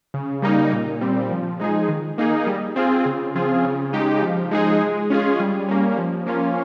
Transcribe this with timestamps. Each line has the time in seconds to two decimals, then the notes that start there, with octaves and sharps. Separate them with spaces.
0.14 C#3
0.42 G3 A#3 D#4
0.72 A#2
1.01 G3 C4
1.31 F3
1.60 G#3 D#4 G#4
1.88 D#3
2.18 A#3 D#4 G#4
2.47 G3
2.76 C4 F4 G#4
3.06 C#3
3.35 F3 C4 F4 G#4
3.64 C#3
3.93 G#3 D#4 G4
4.23 F3
4.51 G#3 D#4 G#4
4.81 G#3
5.10 C#4 F4 G#4
5.40 G3
5.69 A#3 C#4
5.98 F3
6.26 A#3 C#4 F4